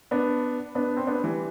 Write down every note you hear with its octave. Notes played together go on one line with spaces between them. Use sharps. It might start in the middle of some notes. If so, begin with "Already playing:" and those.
B3 D4
B3 D4
C4
B3 D4
E3 G3